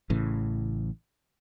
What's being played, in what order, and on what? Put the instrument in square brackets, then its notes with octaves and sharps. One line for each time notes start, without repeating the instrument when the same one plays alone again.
[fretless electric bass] A1 A2 C#3 E3